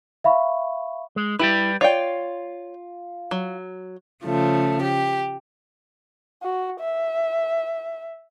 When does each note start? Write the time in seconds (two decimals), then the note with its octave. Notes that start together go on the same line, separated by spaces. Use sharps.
0.24 E5 F5 B5 C#6
1.16 G#3
1.39 G3 E4 G4 B4
1.81 F4 C#5 D5 G5
3.31 F#3
4.24 C#3 F3 A3
4.82 G4
6.43 F#4
6.80 E5